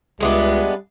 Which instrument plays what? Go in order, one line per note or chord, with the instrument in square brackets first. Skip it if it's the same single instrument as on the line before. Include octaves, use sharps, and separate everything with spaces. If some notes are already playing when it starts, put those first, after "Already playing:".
[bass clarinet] C#2 [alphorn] G3 [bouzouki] G#3 B3 D4 [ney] E5